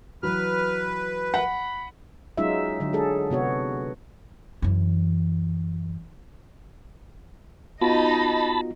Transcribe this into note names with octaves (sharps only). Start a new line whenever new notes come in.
E3 F#3 B4 F6
F#5 B5
F#3 G#3 C#4 D#4 F4 E5
D3 F#3
G#3 G#4 A4
C3 B3 F#4 C#5
F#2 E3
B3 D#4 F4 F#4 D#5 A5 B5